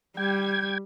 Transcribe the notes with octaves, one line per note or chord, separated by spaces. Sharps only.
G3 G5 G#6